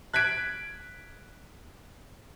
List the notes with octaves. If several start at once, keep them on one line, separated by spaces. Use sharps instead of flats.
F#6 G#6 B6 D7